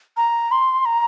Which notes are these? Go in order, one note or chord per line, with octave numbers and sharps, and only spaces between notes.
A#5
C6
A#5